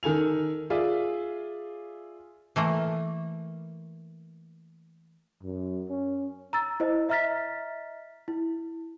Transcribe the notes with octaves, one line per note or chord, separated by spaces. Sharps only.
D#3 A4 G#5 F7
F4 G#4 D5 E5
E3 A3 A#3
F#2
C#4
A#5 E6 A6
E4 C5 D#5
D#5 E5 A#5 F6 A6 B6
E4